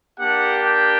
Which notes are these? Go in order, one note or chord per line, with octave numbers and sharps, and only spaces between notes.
A#3 D4 G4 F#5
G5